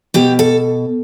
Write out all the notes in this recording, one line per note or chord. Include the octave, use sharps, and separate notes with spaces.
B2 G4
A4